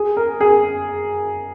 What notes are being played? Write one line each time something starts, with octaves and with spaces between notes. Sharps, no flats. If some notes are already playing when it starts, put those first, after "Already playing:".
Already playing: G#4
A#4
G#4